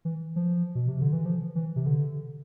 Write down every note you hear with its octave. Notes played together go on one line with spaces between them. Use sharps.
E3
F3
B2
C3
D3
E3
F3
E3
C3
D3